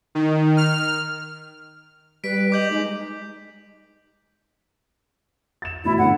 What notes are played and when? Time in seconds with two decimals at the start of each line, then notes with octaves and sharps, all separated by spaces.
0.15 D#3
0.57 F6
2.24 G3 B4 B6 D7
2.52 D#5 D6 G6 F#7
2.71 G#3 D#4
5.62 A6 E7
5.84 A1 B2 E4
5.98 A2 D3 F#5